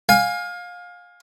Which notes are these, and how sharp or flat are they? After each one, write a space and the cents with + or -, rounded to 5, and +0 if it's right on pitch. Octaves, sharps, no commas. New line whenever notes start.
F5 +25 G#5 -20